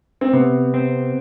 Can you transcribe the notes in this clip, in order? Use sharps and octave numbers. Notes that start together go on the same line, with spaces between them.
C4
C3 B3
C4